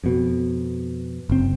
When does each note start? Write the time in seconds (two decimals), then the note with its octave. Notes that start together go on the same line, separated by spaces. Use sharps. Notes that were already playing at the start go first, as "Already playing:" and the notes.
0.04 F2 B2
1.29 F#1 C4